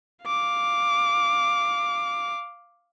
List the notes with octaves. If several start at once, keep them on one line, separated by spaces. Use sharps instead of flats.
F5 D6